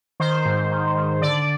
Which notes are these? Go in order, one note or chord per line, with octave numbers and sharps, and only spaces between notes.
D#3 C5
G#2
D#3
D#3
D3 D5